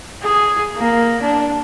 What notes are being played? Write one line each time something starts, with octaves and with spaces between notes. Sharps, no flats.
G#4
A#3
D4